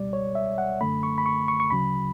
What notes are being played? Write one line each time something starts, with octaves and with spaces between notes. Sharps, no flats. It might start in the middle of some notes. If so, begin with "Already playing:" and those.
Already playing: C#2 B2 G3 D5
C#5
E5
F#5
F#2 D3 A3 B5
C#6
B5
C#6
C#6
C#6
D2 C#3 F#3 B5